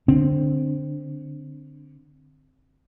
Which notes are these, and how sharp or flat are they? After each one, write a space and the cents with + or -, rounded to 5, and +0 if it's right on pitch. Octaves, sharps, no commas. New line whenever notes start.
D3 +0 C4 +0